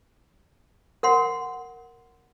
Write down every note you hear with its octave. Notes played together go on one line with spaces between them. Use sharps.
A#4 F#5 C6